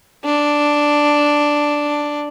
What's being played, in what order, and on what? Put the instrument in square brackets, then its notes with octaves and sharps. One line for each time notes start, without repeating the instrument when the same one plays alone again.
[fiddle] D4